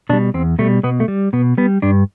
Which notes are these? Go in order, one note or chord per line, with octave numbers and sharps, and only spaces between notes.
B2 G3 D4
E2 C4
B2 G3 A3
B2 B3
A3
G3
B2 B3
G3 B3
G2 D4